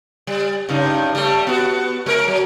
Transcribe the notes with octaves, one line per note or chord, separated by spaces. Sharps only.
G3
G2 C#3 D#4
G3 A3
B3 F#4
G#3 A#4
F#3